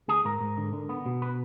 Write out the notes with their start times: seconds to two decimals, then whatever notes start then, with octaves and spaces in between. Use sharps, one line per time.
0.08 D2 G#4
0.25 G#2 A#4
0.41 G#2
0.57 D3
0.73 D3
0.89 B3
1.06 B2
1.22 B4